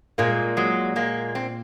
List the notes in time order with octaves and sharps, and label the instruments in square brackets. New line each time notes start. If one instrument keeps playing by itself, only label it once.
[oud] A#2 [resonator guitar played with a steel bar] G#3 A#3
[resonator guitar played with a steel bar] F#3 G#3
G#3 A#3
C4